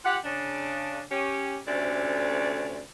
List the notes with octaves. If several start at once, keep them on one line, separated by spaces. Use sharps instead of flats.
F4 G4 F#5
C#3 D4
C#4 G4
D2 C3 A3 C#4 D5